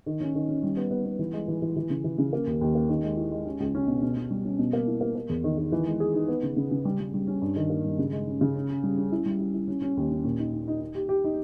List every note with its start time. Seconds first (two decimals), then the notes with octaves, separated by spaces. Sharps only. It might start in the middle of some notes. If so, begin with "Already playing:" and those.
0.06 D#3
0.21 C#4
0.35 D#3
0.49 C#4
0.63 G3
0.77 B3
0.91 B3
1.06 B3
1.19 E3
1.33 G#3
1.48 E3
1.62 E3
1.76 E3
1.90 C#3
2.04 E3
2.18 C#3
2.33 A#3
2.47 D#2
2.61 D#2
2.75 A#3
2.89 D#3
3.03 G#3
3.17 E4
3.31 G#3
3.46 C#4
3.60 C#2
3.75 C#4
3.88 B2
4.02 B2
4.16 B2
4.31 G3
4.45 C#4
4.59 B2
4.73 A#3
4.87 E4
5.01 A#3
5.16 A#3
5.29 E2
5.44 D#3
5.58 D#3
5.72 E3
5.86 G#3
6.00 G#4
6.14 D#4
6.28 B3
6.43 C#3
6.57 C#3
6.71 C#3
6.85 G3
7.00 G3
7.14 G3
7.27 C#4
7.42 G2
7.56 D#3
7.70 A#3
7.85 G2
7.99 C#3
8.12 G#3
8.27 C#4
8.41 C#3
8.55 C#4
8.69 C#4
8.83 G3
8.98 C#4
9.12 E4
9.26 G3
9.40 E4
9.54 E4
9.68 C#4
9.82 C#4
9.97 D#2
10.11 C#4
10.24 A#2
10.39 D#4
10.53 D#4
10.68 D#4
10.81 D#4
10.95 G4
11.09 G4
11.24 D#4